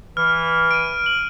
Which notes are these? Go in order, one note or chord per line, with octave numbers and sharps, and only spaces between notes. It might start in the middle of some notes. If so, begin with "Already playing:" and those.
E3 F6
D7 D#7
F#7